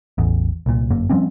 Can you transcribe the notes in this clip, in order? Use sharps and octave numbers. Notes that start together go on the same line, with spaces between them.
A1 E2
C2 A#2
G1 F#2 A#3
F3 G3 C4 C#4